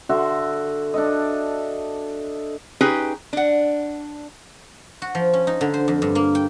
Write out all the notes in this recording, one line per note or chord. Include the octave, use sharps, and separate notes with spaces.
D3 F#4 E5 C6
D4 A4 D#5
C#4 D#4 G4 G#4 B4
D4 F#5
F#4
F3
C#4
D#4
D3
C5
F2
G2
A#3
G5